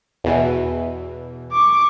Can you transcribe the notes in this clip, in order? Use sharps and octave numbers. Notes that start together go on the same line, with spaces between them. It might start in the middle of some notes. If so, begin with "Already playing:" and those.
E2 B2 E3
C#6 D6